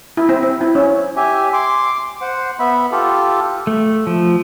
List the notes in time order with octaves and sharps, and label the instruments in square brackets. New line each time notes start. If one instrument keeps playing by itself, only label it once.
[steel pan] E4
C4
C4
E4
C#4
[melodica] G4 E5 G#5
C6 D6
C5 F#5
B3 E5 B5
F4 G4 A4
[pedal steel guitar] A3
F3